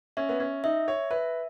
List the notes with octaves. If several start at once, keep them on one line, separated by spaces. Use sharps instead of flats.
C#4 E5
B3
C#4
D#4 E5
C#5
B4 E5